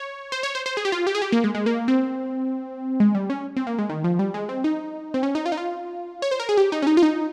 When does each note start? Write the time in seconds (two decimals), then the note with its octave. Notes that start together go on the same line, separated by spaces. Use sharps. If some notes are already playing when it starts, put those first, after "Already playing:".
Already playing: C#5
0.32 C5
0.43 C#5
0.55 C5
0.66 C5
0.77 G#4
0.85 G4
0.92 F4
1.07 G4
1.15 G#4
1.22 G4
1.32 A#3
1.44 G#3
1.55 G#3
1.66 A#3
1.88 C4
3.00 G#3
3.15 G3
3.30 C#4
3.56 C4
3.67 A#3
3.78 G#3
3.89 D#3
4.04 F3
4.19 G3
4.34 G#3
4.49 C4
4.64 D#4
5.14 C4
5.23 C#4
5.35 D#4
5.46 F4
5.52 D#4
5.57 F4
6.22 C#5
6.31 C5
6.40 A#4
6.49 G#4
6.57 G4
6.72 D#4
6.82 C#4
6.87 D#4
6.97 F4
7.03 D#4